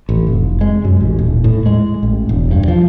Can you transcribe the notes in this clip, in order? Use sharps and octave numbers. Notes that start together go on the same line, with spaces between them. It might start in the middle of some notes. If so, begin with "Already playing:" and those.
A1
F1
G#3
F#2
A1
D#1
A2
G#3
A1
E1
G2
F3